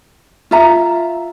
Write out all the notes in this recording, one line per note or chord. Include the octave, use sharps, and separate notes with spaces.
F4 E5 A#5